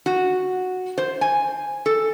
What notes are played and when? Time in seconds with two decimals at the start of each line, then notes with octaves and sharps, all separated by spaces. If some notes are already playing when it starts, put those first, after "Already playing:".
0.06 F#4
0.98 C5
1.21 G#5
1.86 A4